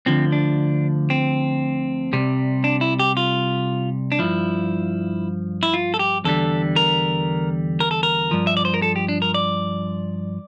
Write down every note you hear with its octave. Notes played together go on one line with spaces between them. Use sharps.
D2 D3 F3 C4
D4
C4
C2 C3 G3
D4
E4
G4
F4
D4
G2 F3 E4
E4
F4
A4
G4
E2 D3 G3 A4
A#4
A#4
A4
A#4
G2 F3
E5
D5
C5
A#4
A4
G4
D4
A#4
D5